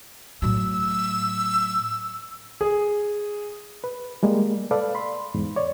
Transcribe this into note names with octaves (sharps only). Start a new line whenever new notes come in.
A2 F#3 E6
G#4
B4
G3 G#3 A#3
A4 B4 D5 F5
B5 C6
E2 G#2
C#5 D5